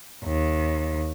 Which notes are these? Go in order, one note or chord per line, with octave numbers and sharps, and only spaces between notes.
D#2